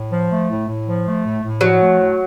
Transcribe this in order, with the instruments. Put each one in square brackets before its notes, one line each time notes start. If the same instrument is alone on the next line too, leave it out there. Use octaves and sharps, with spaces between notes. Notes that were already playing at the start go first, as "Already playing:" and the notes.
Already playing: [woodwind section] A2
F3
A3
A2
A2
F3
A3
A2
A2
[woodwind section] F3 [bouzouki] F#3
[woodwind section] A3
A2